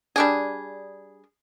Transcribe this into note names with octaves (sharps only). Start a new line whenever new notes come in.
G3 D4 G#4